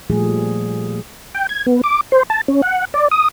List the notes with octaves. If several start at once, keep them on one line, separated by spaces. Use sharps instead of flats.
A#2 F3 G3 A3 G#4
G5
G#6
B3
D6
C5
A5
C#4
F#5
D5
D#6